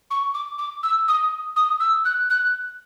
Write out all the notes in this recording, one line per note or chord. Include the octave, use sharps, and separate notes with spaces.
C#6
D6
D6
E6
D#6
D#6
E6
F#6
F#6